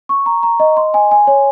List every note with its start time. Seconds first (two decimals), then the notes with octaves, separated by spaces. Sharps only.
0.09 C#6
0.26 A#5
0.43 A#5
0.60 D#5
0.77 C6
0.94 G#5
1.11 G#5
1.27 C#5